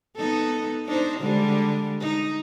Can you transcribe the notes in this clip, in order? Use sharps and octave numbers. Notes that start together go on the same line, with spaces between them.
B3 D#4 A4
D4 D#4 C5
D3 G3 G#3
D#4